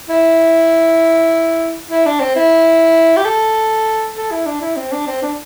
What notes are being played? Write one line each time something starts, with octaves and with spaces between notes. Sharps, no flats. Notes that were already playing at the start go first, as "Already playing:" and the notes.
E4
E4
D4
C4
E4
G4
A4
A4
E4
D4
E4
C4
D4
C4
D4